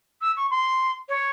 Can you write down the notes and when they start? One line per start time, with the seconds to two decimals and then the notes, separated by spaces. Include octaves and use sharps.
0.21 E6
0.36 C#6
0.50 C6
1.08 C#5